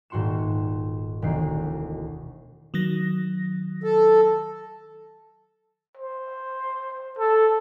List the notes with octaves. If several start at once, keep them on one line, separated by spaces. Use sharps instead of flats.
D#1 G#2 F#4 C6 C#7 E7
E1 D2 D#3 C7
D#3 F#3 A#6
A4
C5
A4